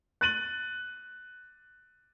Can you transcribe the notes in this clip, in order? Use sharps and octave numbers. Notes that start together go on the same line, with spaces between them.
F#6 A6 D#7 F#7